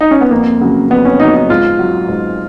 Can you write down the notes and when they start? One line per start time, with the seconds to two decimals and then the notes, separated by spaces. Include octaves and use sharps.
0.01 D#4
0.11 C#4
0.21 B3
0.31 F2 A#3
0.61 C#3 F#3
0.90 F2 B3
1.05 C#4
1.20 C#3 F#3 D#4
1.35 D#4
1.50 G#2 F4
1.79 F#3
2.08 G#2